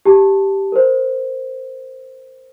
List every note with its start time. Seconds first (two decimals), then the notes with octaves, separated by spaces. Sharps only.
0.05 G4 A5
0.72 A#4 C5